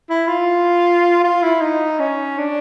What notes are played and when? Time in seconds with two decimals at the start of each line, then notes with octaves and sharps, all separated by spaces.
0.10 E4
0.28 F4
1.24 F4
1.43 E4
1.61 D#4
2.00 C#4
2.38 D4